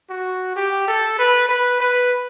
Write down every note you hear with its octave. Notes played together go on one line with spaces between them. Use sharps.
F#4
G4
A4
B4
B4
B4